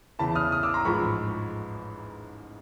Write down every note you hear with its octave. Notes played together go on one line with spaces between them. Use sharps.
E2 C#3 E3 A5 B5
D#6 F6
D#6 F6
D6 E6
A#5 C6
A1 G#2 F3 G#3 B5 C#6